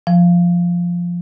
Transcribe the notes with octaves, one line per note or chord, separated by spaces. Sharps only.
F3